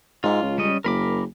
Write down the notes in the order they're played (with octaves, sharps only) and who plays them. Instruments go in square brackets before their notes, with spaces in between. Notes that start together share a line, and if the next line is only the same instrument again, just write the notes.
[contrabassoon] G#2 [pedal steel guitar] F4
[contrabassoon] C#2
[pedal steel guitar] G3 C#4 D#5
[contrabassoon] F#1 [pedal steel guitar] A#4 B5 D6